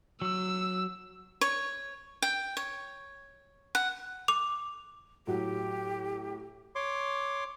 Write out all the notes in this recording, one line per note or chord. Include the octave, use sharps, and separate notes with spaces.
F#3 E6
C#5
G5
C#5
F#5
D6 F7
A2 F#3 F#4 G4
C#5 C6 D6